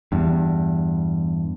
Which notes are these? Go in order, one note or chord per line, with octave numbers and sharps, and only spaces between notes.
E2 G2